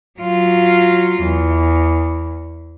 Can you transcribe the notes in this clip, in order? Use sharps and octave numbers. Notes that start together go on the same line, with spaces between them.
F#3 F4
E2